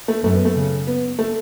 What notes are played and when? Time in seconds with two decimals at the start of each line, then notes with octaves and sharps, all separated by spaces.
0.08 A3
0.24 F#2 A3
0.35 B3
0.45 A3
0.55 C#3
0.87 B3
1.19 A3